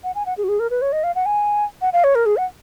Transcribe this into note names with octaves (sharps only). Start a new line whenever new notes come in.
F#5
G#5
F#5
G#4
F#4
G#4
A#4
B4
C#5
D#5
F5
F#5
G#5
F#5
F5
C#5
A#4
G#4
F#5